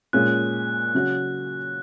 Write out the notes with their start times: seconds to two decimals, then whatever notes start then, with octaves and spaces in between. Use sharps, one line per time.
0.13 A#2 G#3 C#4 F4 F#6
0.94 C#3 F#3 C#4 F#4